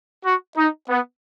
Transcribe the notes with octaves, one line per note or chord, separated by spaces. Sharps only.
F#4
D#4
B3